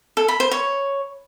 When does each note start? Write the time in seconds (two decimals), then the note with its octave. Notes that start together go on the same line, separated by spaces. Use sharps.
0.17 A4
0.28 B5
0.40 C5
0.51 C#5